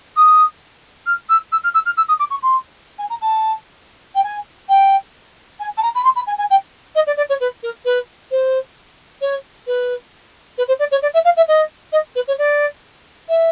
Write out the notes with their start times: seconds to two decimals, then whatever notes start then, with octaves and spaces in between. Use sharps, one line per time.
0.16 D#6
1.06 F6
1.29 E6
1.52 E6
1.63 F6
1.74 E6
1.85 F6
1.97 E6
2.08 D#6
2.19 D6
2.30 C#6
2.42 C6
2.98 G#5
3.09 A#5
3.21 A5
4.15 G5
4.23 G#5
4.69 G5
5.59 G#5
5.77 A5
5.82 A#5
5.95 B5
6.04 C6
6.15 B5
6.26 G#5
6.38 G#5
6.50 G5
6.95 D#5
7.06 D5
7.17 D5
7.29 C#5
7.40 B4
7.63 A#4
7.85 B4
8.31 C5
9.21 C#5
9.67 B4
10.58 B4
10.68 C5
10.79 D5
10.91 C#5
11.02 D5
11.14 E5
11.24 F5
11.37 E5
11.48 D#5
11.92 D#5
12.15 B4
12.27 C#5
12.38 D5
13.28 E5